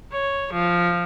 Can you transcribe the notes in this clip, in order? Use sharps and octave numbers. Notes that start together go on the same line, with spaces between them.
C#5
F3